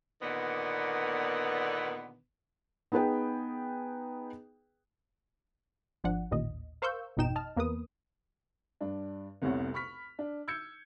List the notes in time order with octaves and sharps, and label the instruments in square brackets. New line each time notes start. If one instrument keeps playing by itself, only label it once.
[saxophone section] A#2 D3 D#3 B3
[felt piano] B3 D#4 G#4 B4 G5
[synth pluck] G#1 F3 D4 F#5
A1 D#2 A#2 D#5
A#4 C5 F5 C#6 E6 G6
G#1 F2 B2 D#4 G5 E7
D#5 A5 F6
E2 A#3 B3 A#4 B4 D#6
[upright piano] G2 D4
F1 C2 C3 B3 C#5 F#5
B5 C#6 F6 B6
D4
E6 G6 G#6 C#7